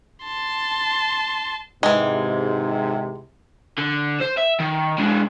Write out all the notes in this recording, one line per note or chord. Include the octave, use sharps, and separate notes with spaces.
A5 C6
G#1 G#2 C3 E3 G#3
D3
C5
E5
D#3
G#3 D4